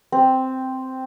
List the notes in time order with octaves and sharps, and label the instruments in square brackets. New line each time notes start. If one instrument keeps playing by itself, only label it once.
[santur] C4